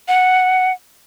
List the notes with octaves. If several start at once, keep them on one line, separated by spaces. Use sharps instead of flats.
F#5